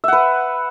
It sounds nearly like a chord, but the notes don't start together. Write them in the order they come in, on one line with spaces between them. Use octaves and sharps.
E5 F#5 B4